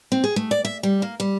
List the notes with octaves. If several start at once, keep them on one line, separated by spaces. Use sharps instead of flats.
C4
G#4
A3
D5
E5
G3
A#3
G3